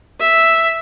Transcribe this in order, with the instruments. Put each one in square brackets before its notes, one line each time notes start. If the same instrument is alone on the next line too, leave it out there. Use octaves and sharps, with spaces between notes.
[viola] E5